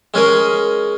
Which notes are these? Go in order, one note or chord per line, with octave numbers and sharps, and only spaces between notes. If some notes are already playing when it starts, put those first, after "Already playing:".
G#3 C#4 G#4 A#4